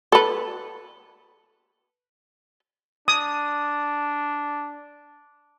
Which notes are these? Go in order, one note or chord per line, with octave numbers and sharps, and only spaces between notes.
A4 B4
D4 D#6